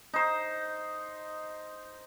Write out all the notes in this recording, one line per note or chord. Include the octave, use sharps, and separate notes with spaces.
D#4 C5